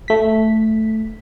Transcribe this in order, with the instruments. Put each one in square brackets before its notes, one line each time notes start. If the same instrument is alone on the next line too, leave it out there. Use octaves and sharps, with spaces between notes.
[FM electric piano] A3 B6